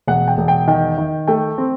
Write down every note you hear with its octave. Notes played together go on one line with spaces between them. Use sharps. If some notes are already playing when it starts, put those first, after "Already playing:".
E1 F#5
G5
E1
G5
D#3 G5
D#3
A3 G5
C4